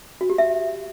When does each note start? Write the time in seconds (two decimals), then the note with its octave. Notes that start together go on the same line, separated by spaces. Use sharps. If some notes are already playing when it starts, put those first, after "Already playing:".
0.21 F#4
0.30 G4
0.38 E5